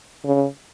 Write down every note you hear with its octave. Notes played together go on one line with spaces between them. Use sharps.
C#3